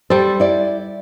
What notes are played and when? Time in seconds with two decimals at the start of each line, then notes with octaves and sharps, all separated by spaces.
0.10 G3 A4 C5
0.40 E4 D5